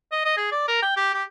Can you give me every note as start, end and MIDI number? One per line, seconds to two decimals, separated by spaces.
0.12 0.23 75
0.25 0.37 75
0.37 0.52 68
0.52 0.64 74
0.68 0.78 70
0.82 0.91 79
0.97 1.10 67
1.14 1.23 67